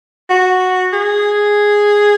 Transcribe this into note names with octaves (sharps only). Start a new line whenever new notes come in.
F#4
G#4